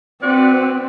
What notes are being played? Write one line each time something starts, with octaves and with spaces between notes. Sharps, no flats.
C4 F#4 B4 D5